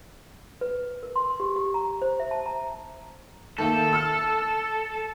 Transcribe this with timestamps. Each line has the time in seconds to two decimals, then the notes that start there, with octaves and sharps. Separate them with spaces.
0.61 B4
1.03 A#4
1.16 C6
1.40 G4
1.56 G4
1.74 A#5
2.02 C5
2.20 E5
2.31 A5
2.46 A#5
3.58 D#3 A3 A#3 A4
3.93 E6 F6